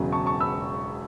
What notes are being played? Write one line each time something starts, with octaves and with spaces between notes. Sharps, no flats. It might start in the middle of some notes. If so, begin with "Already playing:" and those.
Already playing: E1 E2 C#3 F#3
A5 C#6
A5 C#6
B5 E6